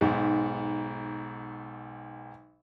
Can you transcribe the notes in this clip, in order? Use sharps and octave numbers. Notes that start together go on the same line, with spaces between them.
B1 G#2